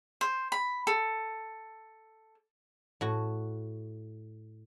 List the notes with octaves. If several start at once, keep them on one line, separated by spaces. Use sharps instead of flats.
C5
B5
A4
A2 F#4